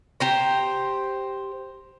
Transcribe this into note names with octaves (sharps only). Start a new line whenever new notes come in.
G4 C5 A#5